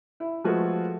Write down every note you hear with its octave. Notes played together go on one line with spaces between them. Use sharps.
E4
F3 G#3 A3 F4 F#4 B4